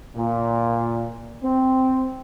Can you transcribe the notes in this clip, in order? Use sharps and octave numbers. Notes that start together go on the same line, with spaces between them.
A#2
C4